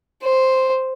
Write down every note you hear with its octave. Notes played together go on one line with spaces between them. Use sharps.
C5